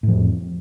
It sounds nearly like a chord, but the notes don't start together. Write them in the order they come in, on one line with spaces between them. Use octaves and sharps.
A2 F3 F2